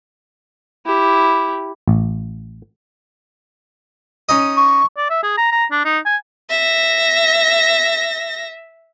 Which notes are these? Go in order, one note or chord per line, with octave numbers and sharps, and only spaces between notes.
E4 G4
A1
C#4 D#4 D#5
C#6
D5
E5
G#4
A#5
A#5
D4
D#4
G#5
E5 A#6